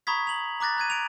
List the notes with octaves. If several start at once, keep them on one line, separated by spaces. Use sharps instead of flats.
A#5 B5 C#6 D#6 G#6 B6
F7 F#7
A#5 D6 F#6 A6 A#6
A#5 F#6 G#6 D#7
D7 F7